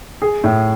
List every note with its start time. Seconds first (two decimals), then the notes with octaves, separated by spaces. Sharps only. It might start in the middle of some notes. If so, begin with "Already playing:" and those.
0.22 G#4
0.44 A2